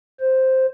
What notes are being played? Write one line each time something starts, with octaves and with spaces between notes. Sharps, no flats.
C5